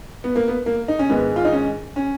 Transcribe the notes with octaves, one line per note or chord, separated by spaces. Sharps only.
B3
A#3
B3
A#3
D#4
C#4
G#2 D#3 G#3 B3
F4
D#4
C#4
C#4